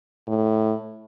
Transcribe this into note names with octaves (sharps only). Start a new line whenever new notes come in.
A2